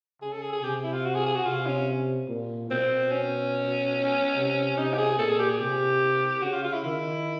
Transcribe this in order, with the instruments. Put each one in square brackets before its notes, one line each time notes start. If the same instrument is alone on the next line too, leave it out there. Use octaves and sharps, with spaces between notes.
[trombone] C#3 [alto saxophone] G#4
[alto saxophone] A4
G#4
G#4
[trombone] C3 [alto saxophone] G4
[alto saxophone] E4
F4
F#4
G#4
G#4
F#4
[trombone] C3 [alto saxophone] F4
[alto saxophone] C#4
[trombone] A#2
[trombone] B2 [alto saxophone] C4
[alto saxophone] C#4
[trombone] C3
[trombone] C3 [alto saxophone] D#4
[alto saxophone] G4
G#4
[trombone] A#2 [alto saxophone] A4
[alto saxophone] G#4
G4
G#4
[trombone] C3 [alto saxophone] G4
[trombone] C#3 [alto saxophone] F#4
[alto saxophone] F4
F4
E4
[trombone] D#3 [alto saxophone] E4